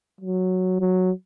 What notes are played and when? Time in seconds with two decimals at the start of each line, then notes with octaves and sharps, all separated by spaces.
0.21 F#3
0.80 F#3